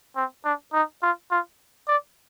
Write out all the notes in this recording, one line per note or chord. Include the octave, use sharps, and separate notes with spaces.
C4
D4
D#4
F4
F4
D5